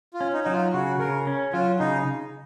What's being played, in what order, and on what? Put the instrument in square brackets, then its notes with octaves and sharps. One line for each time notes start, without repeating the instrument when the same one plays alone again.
[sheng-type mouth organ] F4
[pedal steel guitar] C#4
[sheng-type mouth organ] D#4
[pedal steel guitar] F#3 [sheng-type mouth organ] D#4
[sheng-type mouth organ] F4
[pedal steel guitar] C#3 [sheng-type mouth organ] F#4
[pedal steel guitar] C#3 [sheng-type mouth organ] A#4
[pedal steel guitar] C#4
[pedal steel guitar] F#3 [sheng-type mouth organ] F4
[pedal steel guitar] C#3 [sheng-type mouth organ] D#4